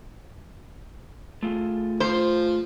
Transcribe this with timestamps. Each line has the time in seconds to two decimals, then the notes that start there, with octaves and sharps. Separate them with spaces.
1.43 A3 F4 G#4
2.00 F3 C5